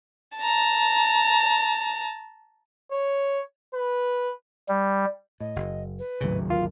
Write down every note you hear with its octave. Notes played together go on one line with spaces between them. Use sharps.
A5 A#5
C#5
B4
G3
A2 D#5
F#1
B4
G#1 D#2 A2 C#3 F#3
D2 F4 A#4